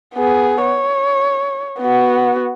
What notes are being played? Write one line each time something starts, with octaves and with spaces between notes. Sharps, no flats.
B3 G#4
C#5
B3 F#4